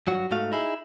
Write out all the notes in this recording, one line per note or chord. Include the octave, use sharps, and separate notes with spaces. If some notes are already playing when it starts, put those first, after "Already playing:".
G2 F#3 F#4
G#2 G#3 A3 F#4 F5
D#4 E4 G#4